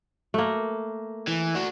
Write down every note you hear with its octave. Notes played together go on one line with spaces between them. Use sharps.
A3 A#3
E3
D4 F#4